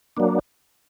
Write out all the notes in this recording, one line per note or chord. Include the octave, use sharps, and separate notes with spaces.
F#3 A#3 D4